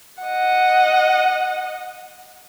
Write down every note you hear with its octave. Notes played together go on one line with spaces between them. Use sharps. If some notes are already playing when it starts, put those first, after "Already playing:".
D#5 F#5